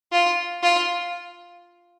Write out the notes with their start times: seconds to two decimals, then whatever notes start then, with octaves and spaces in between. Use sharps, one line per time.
0.12 F4
0.63 F4